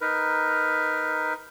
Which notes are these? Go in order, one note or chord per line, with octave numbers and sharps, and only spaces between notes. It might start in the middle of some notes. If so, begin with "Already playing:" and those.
D#4 A#4 B4